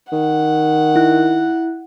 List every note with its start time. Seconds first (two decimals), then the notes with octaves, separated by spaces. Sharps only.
0.12 D#3 F#5
0.96 E4 F#6